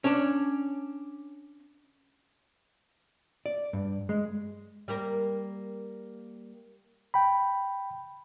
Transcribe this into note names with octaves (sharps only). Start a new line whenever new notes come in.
C#4 D4
D5
G2
G#3
G3 A#3 A#4
G5 B5